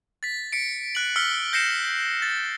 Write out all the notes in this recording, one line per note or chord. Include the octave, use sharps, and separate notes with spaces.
A6 B6
B6 C#7 D7
F#6 F#7
E6 F6 B6 C#7 G7
G6 A#6 C7 C#7 E7
A6